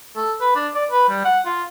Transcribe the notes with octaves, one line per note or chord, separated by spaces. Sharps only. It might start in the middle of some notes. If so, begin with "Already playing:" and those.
A4
B4
D4
D5
B4
G3
F#5
F4